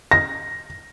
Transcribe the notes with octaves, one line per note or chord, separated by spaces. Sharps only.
A#6